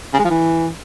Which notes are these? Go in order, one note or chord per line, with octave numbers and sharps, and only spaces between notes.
C#3
G#3
F3
E3